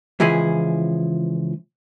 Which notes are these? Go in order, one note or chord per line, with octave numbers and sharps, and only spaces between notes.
C#2 E3 F3 E4 G#4